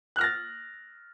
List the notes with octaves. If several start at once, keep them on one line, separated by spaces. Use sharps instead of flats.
F6 F#6 A6 A#6